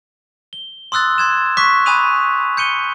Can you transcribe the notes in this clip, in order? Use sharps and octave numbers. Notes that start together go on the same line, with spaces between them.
G7
C6 D#6 E6 F#6 A6
C6 G#6 E7
C#6 D6 F#6 B6
G#5 B5 D#6 F#6 D#7 F7
G6 C#7 D#7 G7